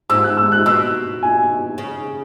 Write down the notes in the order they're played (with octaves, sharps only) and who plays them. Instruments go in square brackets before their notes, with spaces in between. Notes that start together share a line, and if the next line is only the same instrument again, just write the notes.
[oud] G#2 [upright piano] E6
[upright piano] F#6
E6
F#6
[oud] B2 [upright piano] E6
[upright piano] G#5
[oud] C#3